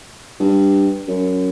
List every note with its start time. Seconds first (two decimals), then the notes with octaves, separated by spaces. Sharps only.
0.40 G2
1.08 F#2